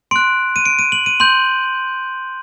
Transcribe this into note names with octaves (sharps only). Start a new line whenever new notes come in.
C6 F#6 D7
D#7
D7
D#7
F#7
D#7
C6 G6 F#7